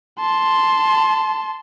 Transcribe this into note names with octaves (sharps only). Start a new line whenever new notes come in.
A5 C6